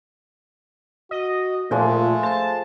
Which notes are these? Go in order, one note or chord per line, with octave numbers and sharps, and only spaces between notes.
F#4 D#5
A#2 F3 G#3 A3 G5
C5 A5